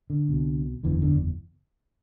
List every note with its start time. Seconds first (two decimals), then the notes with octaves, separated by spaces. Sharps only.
0.10 D3
0.29 C2 B2
0.83 F#1 E2 D3 E3
1.02 D3